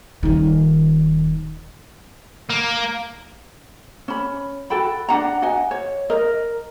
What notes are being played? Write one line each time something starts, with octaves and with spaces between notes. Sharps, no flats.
D#1 D#3
A#3
C#4 B5
F#4 A4 G5 B5
D4 F#5 A#5
F#4 D#5 F#5 G#5
C#5
A#4 D#5